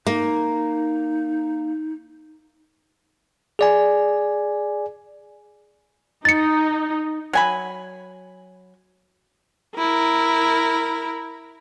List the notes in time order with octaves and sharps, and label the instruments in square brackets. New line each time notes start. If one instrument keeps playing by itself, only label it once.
[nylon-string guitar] A#3 [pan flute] D#4
[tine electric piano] G#4 D5 G#5
[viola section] D#4 [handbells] A6 C#7
[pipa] F#3 G#5 B5
[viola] E4 A#4